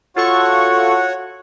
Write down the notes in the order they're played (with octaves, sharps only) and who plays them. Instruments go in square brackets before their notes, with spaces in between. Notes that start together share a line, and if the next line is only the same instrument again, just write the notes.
[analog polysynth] F4 A4 C#6 [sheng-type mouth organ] F#4 C#5 F#5